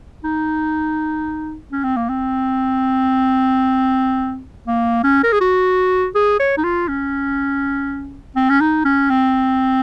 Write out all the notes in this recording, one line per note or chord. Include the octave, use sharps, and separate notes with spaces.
D#4
C#4
C4
A#3
C4
A#3
C#4
A#4
G#4
F#4
G#4
C#5
D#4
F4
C#4
C4
C#4
D#4
C#4
C4